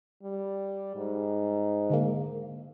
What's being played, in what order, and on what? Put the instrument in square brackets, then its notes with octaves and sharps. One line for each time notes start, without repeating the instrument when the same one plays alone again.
[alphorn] G3
G#2
[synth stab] D3 G#3 A#3